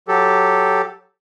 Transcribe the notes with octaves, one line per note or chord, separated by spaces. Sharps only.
F#3 G4 A4